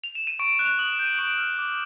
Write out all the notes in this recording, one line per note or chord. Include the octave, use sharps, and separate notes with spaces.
F7
E7
D#7
C#6 D7
D#7
F#6
F7
D#6 F#7
E7
G6
D#7
C#6 D7
F6
D6